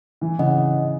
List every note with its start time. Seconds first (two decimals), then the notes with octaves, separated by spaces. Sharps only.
0.21 E3
0.39 C#3 D#5 F#5